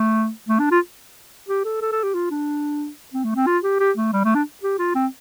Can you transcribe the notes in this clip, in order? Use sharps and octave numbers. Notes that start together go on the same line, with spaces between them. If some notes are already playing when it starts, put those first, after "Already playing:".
Already playing: A3
A3
D4
F4
G4
A4
A4
A4
G4
F4
D4
C4
A3
C4
F4
G4
G4
A3
G3
A3
D4
G4
F4
C4